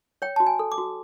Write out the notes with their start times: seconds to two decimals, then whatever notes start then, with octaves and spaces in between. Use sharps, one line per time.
0.22 C#5 G5
0.36 F#4 A5
0.46 G#5
0.59 A4
0.72 D6
0.78 F#4